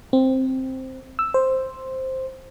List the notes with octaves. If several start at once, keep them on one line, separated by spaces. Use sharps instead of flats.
C4
E6
C5